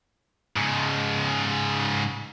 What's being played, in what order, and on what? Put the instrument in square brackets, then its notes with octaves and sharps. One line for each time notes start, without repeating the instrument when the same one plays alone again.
[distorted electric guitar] G#2 C#3